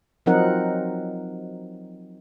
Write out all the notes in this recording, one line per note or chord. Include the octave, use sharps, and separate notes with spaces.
F3 F#3 C4 D#4 A#4 F#5